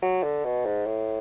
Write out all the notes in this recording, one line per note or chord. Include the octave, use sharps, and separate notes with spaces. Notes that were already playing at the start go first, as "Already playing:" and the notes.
F#3
D3
B2
G#2
A2